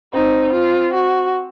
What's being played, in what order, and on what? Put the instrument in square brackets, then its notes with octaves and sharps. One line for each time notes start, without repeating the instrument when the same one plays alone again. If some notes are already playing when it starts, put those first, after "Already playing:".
[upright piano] C4 [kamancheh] D#4
[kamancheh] F4
F#4